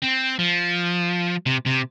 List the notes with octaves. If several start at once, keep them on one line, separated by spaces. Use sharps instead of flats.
C4
F3
C3
C3